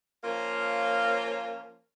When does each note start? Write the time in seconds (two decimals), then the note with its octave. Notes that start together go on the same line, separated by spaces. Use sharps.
0.24 F3 A#3 C#4 F4 C#5 F5